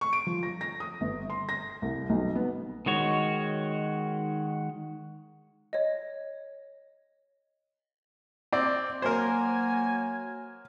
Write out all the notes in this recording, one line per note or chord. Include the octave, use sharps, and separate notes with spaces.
C#6
D7
F3
A#6
A#6
D#6
G1
C6
A#6
C2
B1
B3
D#3 G#3 F#4 C#5
C#5 D#5
C4 D5
F#3 A#3 A#4 C5 G#5